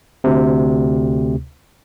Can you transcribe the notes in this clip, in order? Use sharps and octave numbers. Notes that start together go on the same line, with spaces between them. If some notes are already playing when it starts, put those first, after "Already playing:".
D2 C3